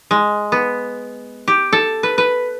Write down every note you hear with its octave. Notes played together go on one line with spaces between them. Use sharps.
G#3
B3
G4
A4
B4
B4